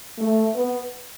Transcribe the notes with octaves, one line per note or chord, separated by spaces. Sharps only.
A3
B3